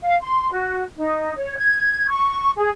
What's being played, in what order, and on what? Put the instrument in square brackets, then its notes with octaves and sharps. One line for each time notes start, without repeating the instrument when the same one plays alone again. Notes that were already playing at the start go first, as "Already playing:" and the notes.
[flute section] F5
C6
F#4
D#4
C#5
G#6
C#6
G#4